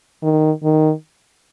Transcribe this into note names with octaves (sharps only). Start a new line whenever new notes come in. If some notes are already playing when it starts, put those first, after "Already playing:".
D#3
D#3